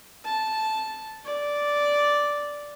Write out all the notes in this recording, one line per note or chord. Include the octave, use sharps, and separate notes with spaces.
A5
D5